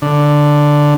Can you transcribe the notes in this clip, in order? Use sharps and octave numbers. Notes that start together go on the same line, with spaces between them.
D3